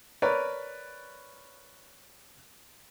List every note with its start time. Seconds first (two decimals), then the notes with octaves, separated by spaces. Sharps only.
0.22 A#4 B4 C#5 D5